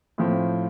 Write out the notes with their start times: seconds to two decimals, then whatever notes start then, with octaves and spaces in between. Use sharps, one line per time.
0.18 A2 F3 C4